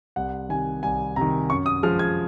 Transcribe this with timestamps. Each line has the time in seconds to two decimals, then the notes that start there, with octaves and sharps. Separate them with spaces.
0.16 C2 F#5
0.49 C3 D#3 G#5
0.83 C2 G#5
1.16 C3 D#3 A#5
1.50 F#2 C#6
1.66 D#6
1.83 F3 G#3 F6
1.99 G#6